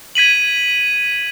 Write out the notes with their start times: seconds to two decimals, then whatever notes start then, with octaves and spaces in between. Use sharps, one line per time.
0.15 G#6 B6 D#7 F#7